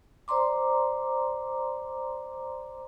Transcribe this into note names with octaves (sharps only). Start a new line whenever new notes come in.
C5 D5 A#5 C6 D6